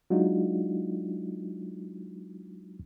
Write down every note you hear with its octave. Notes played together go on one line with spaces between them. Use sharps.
F#3 G#3 D4 D#4 F4 F#4